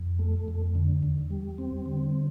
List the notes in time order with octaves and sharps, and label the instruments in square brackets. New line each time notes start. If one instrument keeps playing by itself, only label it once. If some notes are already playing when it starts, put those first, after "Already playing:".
Already playing: [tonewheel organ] F2
A3
F2
D3
E2
G3
C4
D3